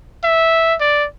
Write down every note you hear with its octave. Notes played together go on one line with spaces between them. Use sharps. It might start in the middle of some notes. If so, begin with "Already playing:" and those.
E5
D5